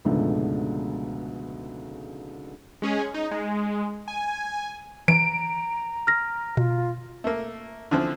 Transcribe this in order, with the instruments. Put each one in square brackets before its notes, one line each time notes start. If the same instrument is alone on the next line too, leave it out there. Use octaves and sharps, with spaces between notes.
[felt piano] C#2 G#2 B2 D3 F3 A3
[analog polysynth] G#3 C#4 G#4
D#4
G#3
G#5
[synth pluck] E3 [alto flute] A#5 [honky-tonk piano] D7
[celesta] F6 A#6
[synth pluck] B2 [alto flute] F4
[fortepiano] A3 A#3
D3 E3 F3 C4